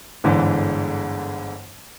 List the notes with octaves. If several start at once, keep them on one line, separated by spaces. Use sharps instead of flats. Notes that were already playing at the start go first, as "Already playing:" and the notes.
G1 G#2 D3 E3